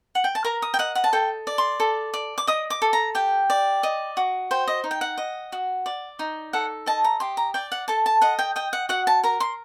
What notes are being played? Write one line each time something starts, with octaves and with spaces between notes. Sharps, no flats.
F#5
G5
A5
A#4 A#5
D#6
G5
D#5 F#5
F#5
A5
A4 G5
D5
C6
A4
D5
D6
D#5 D#6
D6
A4
A#5
G4 G5
D5
D#5
F#4
C5 G5
D#5
D#4
G5
F#5
D#5
F#4
D5
D#4
A4 F#5
D#5 A5
A#5
G4 C6
A#5
D5 G5
F#5
A4 A5
A5
D#5 F#5
G5
D#5 G5
F#5
F#4 F#5
A5
A#4 A#5
C6